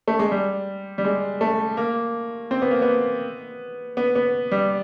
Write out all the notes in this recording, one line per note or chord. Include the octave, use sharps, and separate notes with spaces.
A3
G#3
G3
G3
G#3
A3
A#3
C4
B3
A#3
B3
B3
B3
G3